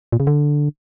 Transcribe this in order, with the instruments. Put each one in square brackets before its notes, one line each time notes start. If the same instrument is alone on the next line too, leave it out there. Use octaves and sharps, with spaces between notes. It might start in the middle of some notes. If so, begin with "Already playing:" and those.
[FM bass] A#2
C#3
D3